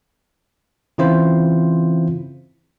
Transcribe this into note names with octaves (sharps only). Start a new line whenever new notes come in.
C#3 E3 C4 E4 F4 C5